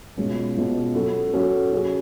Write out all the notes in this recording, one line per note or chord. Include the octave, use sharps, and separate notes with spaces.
B2 G#3 C#4 F4
B2 G#3 C#4 F4
F#3 C#4 F#4 A4
F#3 C#4 F#4 A4
F#3 C#4 G#4